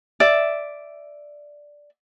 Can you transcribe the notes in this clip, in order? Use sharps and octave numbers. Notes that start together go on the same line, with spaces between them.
D5 E5